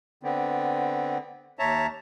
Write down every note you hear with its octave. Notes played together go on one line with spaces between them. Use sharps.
D3 B3 C4
D#2 C#5 E5 A5 A#5